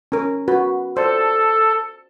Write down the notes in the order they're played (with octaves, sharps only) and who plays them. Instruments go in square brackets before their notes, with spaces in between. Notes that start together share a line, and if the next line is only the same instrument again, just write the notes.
[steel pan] C#4 A#4
F#4 B4
[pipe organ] A4 [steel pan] C5 D5